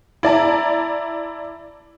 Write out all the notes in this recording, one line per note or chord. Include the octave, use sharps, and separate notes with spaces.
E4 D5 A5 A#5